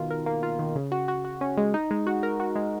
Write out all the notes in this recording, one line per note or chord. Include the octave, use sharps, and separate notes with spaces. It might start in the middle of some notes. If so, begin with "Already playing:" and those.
Already playing: B2 D#3 F4
A#4
A#3
F4
D#3
C#3
F#4
F#4
F#4
C#4
G#3
D#4
G#3
F#4
A#4
F#4
G#3